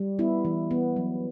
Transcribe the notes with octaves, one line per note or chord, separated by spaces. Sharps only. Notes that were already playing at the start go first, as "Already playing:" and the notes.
Already playing: G3
B3 E4
E3
B3
F#3